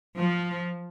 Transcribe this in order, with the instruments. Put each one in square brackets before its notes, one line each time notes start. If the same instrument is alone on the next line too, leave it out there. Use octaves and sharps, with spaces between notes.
[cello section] F3